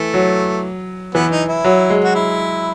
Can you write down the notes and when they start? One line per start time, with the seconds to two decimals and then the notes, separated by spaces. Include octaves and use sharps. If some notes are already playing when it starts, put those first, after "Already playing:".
Already playing: E3 A3
0.14 F#3
1.14 E3 B3
1.31 D#4
1.48 E4
1.64 F#3
1.90 G#3
2.04 F#4
2.15 E4